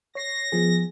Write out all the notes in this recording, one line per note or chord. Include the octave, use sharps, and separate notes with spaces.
C#5 A#6 C7
F3 B3 G#4